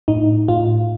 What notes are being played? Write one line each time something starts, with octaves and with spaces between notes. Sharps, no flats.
A2 D#4
A2 F4